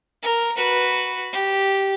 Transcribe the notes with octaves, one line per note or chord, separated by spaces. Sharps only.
A#4
F#4 B4
G4